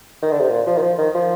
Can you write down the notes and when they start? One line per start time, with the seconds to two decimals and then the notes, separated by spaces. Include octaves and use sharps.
0.23 D#3
0.31 D3
0.40 C3
0.50 A#2
0.67 F3
0.77 D#3
0.82 F3
0.98 D#3
1.15 F3